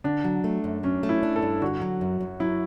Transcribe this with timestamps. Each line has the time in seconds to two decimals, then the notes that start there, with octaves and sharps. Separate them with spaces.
0.04 D3 D4
0.24 F#3
0.44 A3
0.64 F#2
0.83 F#3 C#4
1.03 A3
1.09 E4
1.23 D4
1.36 A4
1.42 G2
1.62 D3 F#4
1.82 F#3
2.01 F#2
2.21 F#2
2.40 F#3 E4